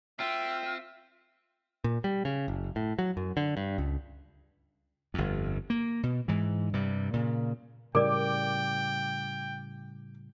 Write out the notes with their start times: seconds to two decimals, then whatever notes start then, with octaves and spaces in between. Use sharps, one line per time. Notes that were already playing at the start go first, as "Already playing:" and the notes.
0.20 C4 F4 E5 G5
1.84 A#2
2.04 G3
2.25 C#3
2.48 F#1
2.76 A2
2.99 F#3
3.17 F#2
3.37 D3
3.57 G2
3.78 C#2
5.14 G1 F2
5.70 A#3
6.03 B2
6.28 G#2 E3
6.73 G2 C3 G3
7.13 A#2 C#3
7.95 A2 C#3 G3 A#4 D5 G5 D6